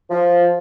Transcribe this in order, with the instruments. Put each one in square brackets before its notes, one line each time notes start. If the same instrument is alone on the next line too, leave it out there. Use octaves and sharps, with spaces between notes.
[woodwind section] F3